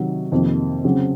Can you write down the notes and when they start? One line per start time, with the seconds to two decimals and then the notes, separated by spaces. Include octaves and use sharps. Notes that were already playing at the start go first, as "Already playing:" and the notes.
Already playing: C3 D#3 F#3
0.32 F2 C3 D#3 A#3
0.84 C#3 F#3 C4